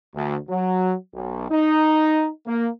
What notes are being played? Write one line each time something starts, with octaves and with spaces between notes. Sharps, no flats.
D2
F#3
B1
D#4
A#3